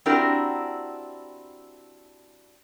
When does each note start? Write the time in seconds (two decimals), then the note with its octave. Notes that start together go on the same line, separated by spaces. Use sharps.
0.06 C4 D4 E4 F#4 G4 A#4